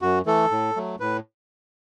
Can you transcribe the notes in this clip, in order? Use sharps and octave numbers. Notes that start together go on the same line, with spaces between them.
F#2 F#4
E3 A3 A4
A2
F#3 A3
A2 B4